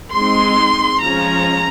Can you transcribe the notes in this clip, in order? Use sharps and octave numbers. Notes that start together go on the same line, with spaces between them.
G#3 C4 D#4 C6
F3 G#3 C#4 A#5